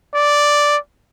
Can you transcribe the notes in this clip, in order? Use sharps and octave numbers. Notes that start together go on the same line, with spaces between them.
D5